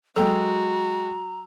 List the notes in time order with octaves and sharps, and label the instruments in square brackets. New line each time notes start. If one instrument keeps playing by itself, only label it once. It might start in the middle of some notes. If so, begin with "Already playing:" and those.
[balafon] F#3 A4 [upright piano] G#3 G5 E6 [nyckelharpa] F#4 [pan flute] A#5